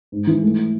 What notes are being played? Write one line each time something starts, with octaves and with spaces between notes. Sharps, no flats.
G#2
E3
A3